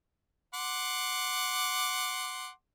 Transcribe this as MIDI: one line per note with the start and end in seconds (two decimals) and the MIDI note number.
0.54 2.50 78
0.54 2.50 84
0.54 2.50 86